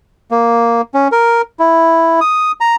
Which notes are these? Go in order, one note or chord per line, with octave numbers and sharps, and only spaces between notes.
A#3
C#4
A#4
E4
D#6
A#5